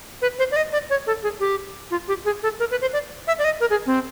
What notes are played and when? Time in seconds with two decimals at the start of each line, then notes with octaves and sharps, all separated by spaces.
0.22 B4
0.39 C5
0.52 D5
0.56 D#5
0.73 D5
0.90 C#5
1.07 A4
1.23 G#4
1.40 G4
1.91 F4
2.08 G4
2.25 G#4
2.43 A4
2.60 A#4
2.71 B4
2.81 C5
2.93 D5
3.27 E5
3.39 D5
3.44 D#5
3.60 A#4
3.70 G#4
3.86 C4